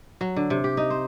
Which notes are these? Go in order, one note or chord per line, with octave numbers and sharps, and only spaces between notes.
F#3
D3
C3
G4
D#4
C5